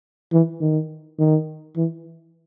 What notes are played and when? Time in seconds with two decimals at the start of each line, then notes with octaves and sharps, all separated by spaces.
0.32 E3
0.61 D#3
1.19 D#3
1.77 E3